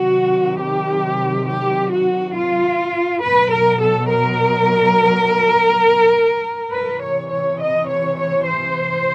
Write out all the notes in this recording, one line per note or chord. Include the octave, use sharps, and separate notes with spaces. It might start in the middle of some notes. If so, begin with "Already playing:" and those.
Already playing: C3 D#3 F#3 F#4
G4
G4
F#4
F4
B2 F#3 B4
A#4
A4
A#4
C3 E3 B4
C#5
C#5
D#5
C#5
C#5
C5